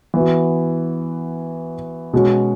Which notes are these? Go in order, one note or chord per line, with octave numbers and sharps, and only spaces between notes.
E3 B3 F#4
B2 G#3 C#4 F#4